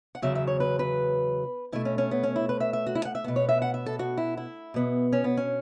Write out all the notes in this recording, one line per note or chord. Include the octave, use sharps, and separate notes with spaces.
F#5
E2 C#3 F#3 E5
E5
C#5
B4
B4
B2 A3 E4
C#4
C#4
B3
C#4
E4
B4
E5
E5
F#4
E4
F#5
E5
B2 B3
C#5
E5
F#5
E5
A4
F#4
E4
E4
B2 B3
C#4
B3
C#4